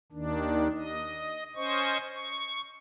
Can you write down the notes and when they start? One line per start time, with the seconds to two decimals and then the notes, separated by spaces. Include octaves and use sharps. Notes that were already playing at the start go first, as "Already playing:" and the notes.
0.12 D#2 D#3 D4
0.75 D#5
1.56 C#4 C5 D#5 C#6
2.14 C#6